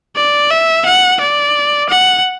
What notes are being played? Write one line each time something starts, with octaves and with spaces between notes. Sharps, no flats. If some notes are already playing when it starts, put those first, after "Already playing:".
D5
E5
F#5
D5
F#5